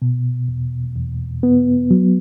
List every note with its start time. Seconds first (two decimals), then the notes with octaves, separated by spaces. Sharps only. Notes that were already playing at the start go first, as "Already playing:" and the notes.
0.02 B2
0.48 E2
0.96 E2
1.43 B3
1.91 F#3